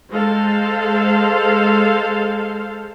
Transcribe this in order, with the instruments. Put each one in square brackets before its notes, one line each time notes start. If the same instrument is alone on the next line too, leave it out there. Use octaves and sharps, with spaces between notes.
[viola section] G#3 A4 C5 F5